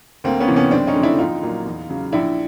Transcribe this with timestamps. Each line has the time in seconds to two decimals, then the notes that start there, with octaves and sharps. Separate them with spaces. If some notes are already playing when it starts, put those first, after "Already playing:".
0.24 D2 A#3 C4
0.40 B3 C#4
0.48 C3 E3
0.56 B3 C#4
0.71 F#1 C4 D4
0.87 C#4 D#4
0.95 F2 D3
1.03 D4 E4
1.18 A#1 D#4 F4
1.43 A#2 F#3
1.66 E2
1.90 C#3 F#3
2.13 A#1 D4 E4